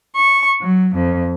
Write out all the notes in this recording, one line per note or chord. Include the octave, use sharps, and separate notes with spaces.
C#6
F#3
F2